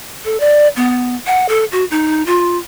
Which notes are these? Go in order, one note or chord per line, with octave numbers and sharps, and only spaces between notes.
A4
D5
B3
F#5
A4
F#4
D#4
F4